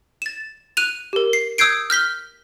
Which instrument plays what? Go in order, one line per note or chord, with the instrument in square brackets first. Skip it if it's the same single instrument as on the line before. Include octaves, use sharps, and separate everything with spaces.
[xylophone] A6 E7
F#6 D#7 F7
G4 A#4
C7
D#6 E6 G6 G#6 C7 D7
F6 G6 B6 G7